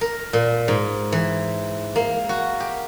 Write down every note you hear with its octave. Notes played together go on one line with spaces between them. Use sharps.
A#4
A#2
G#2
E3
A#3
F#4
G4